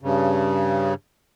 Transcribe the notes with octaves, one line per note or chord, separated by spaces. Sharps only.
G2 C#3